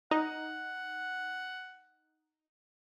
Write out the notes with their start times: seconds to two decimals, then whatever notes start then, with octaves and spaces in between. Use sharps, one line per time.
0.11 D#4 F#5